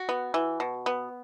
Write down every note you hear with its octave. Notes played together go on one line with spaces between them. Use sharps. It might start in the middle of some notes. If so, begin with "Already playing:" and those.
Already playing: F#4
B3
E3
B2
B3